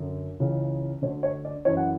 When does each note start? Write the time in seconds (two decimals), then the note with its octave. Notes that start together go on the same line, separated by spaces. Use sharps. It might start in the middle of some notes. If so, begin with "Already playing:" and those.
Already playing: F#2 D3
0.40 C#2 C#3 E3
1.02 D2 D3 C#5
1.23 C#5
1.45 D5
1.65 F#2 E3 C#5
1.77 F#5